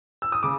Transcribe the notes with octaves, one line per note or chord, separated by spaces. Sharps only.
E6
D#6
C#3 D6